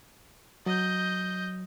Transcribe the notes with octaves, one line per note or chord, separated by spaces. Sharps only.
F#3 D#5 G6